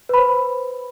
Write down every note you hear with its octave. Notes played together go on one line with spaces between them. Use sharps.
B4 C5 B5